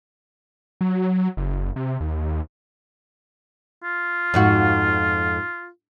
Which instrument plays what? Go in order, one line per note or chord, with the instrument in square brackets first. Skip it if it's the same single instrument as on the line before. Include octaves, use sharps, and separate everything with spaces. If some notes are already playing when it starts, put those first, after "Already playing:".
[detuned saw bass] F#3
F#1
C3
D#2
[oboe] F4
[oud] F2 G#2 F#4